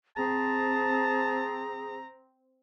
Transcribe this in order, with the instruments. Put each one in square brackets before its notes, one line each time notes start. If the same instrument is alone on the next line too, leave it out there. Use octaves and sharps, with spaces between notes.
[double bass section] C4 [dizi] G#4 [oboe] A5 [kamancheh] A#5